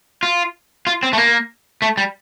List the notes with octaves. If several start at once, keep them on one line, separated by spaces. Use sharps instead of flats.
F4
F4
C4
A3
A#3
A3
G3